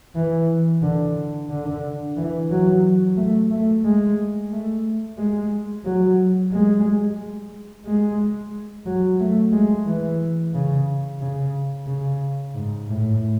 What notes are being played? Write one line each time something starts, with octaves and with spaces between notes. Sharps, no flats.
E3
D3
D3
E3
F#3
A3
A3
G#3
A3
G#3
F#3
G#3
G#3
F#3
A3
G#3
E3
C#3
C#3
C#3
G#2
A2